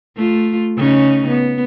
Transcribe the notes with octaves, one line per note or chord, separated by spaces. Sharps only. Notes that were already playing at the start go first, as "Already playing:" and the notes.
A3 F4
C#3 C#4 D#4
B3